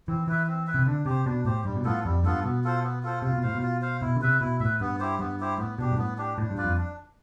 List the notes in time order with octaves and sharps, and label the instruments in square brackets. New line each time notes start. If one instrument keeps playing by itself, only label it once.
[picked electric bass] E3 [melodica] C4
[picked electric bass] E3 [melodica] E4 B4 E5
[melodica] C4
E4 B4 E5
[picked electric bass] C3
[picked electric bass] D3 [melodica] D4
[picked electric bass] C3 [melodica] G4 C5
[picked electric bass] B2 [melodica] D4
[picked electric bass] A2 [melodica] G4 C5
[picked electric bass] G2 [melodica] G3
[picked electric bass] B2
[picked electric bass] A2 [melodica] B3 F4 A4
[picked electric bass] F2 [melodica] G3
[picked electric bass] G2 [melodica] B3 F4 A4
[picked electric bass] B2 [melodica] B3
[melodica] F4 A4 C5
B3
F4 A4 C5
[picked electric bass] C3 [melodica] F4
[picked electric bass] B2
[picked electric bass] A2 [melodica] C5 F5
[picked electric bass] B2
[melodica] F4
C5 F5
[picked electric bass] B2 [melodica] E4
[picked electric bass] D3
[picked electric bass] C3 [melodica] B4 E5
[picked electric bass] B2 [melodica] E4
[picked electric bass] A2 [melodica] B4 E5
[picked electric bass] G2 [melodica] B3
[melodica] E4 G4 C5
[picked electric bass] G2 [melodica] B3
[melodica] E4 G4 C5
[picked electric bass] A2 [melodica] B3
[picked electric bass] B2 [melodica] D4 G4
[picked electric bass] G2
[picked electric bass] A2 [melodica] B3
[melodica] D4 G4
[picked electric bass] A2 [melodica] D4
[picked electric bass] G2
[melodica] F4 B4 D5
[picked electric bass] F2
[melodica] D4